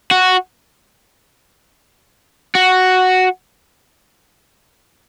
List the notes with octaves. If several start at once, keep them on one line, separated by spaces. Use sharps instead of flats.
F#4
F#4